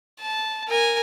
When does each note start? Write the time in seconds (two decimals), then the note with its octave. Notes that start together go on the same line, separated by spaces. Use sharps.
0.21 A5
0.68 A#4 G#5